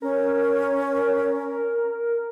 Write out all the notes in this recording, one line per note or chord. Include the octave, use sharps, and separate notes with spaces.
C#4 A#4